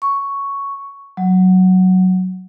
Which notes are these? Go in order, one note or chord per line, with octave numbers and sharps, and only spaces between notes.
C#6
F#3